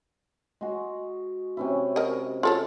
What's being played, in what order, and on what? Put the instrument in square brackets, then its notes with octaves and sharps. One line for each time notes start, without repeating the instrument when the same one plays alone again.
[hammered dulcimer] G#3 F#4
C3 C#4 E4
[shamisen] A#4 D#5
F4 A4 C#5